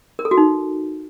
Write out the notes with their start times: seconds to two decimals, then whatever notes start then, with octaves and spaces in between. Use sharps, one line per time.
0.19 A#4
0.25 A4
0.31 F#4
0.37 D#4